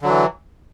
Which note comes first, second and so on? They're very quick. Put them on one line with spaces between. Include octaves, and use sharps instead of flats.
D3 F#3 E3